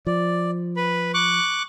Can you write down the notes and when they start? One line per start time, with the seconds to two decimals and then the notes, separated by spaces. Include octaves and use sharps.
0.07 F3 D5
0.76 B4 B5
1.14 C#6 D6 F#6